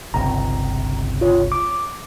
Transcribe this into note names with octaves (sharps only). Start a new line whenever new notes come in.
G1 C#2 C3 A#5
F4 C#5
D6